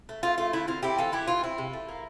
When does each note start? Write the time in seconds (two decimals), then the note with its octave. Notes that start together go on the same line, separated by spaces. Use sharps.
0.09 A3
0.23 A3 F4
0.38 A3 F4
0.53 D3 E4
0.67 C4 F4
0.83 C4 E4 G4
0.98 E3 F4 A4
1.12 E3 E4 G4
1.28 E3 F4
1.43 C4 E4
1.58 C3
1.73 A3
1.88 A#3